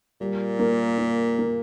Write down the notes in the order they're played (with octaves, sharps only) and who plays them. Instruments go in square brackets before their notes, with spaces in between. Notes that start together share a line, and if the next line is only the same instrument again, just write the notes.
[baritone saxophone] A#2 [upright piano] G3
[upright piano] A#3
A#3
A#3